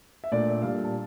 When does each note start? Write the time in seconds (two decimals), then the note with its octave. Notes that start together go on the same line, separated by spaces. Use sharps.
0.24 E5
0.32 A#2 A3 D4 D5
0.62 A#2 G3 D4 F5
0.85 A5